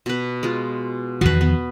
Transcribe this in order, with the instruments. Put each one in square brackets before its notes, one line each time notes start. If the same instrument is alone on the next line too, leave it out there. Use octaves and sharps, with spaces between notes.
[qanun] B2 B4
G#3 F4
[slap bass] E2 D#3 F3 [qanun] F#4 B4
[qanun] B3